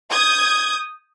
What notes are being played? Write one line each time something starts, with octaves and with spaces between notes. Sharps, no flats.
D#6 G6 G#6